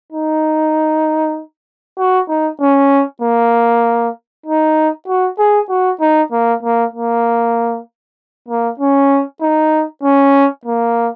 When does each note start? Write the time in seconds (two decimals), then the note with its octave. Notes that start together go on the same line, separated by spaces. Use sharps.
0.12 D#4
1.98 F#4
2.29 D#4
2.60 C#4
3.22 A#3
4.46 D#4
5.08 F#4
5.39 G#4
5.70 F#4
6.01 D#4
6.32 A#3
6.63 A#3
6.94 A#3
8.49 A#3
8.80 C#4
9.41 D#4
10.04 C#4
10.65 A#3